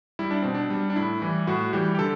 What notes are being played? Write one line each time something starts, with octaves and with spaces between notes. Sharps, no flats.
G3 E4
D4
B2 C4
D4
G3
D4
A2 E4
E3 G3
A2 F#4
E3 G3 G4
G4
D3 A4